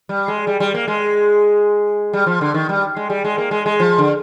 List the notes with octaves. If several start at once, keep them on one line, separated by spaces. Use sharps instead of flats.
G3
G#3
G3
G3
A#3
G#3
G3
F3
D3
D#3
G3
G#3
G3
G#3
A#3
G#3
G#3
F3
D3